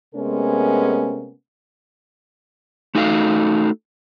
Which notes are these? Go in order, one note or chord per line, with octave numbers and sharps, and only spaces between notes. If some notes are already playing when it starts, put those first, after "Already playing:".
C3 G#3 A3 B3 C#4 A#4
A3 D#4 F#4 A4 F5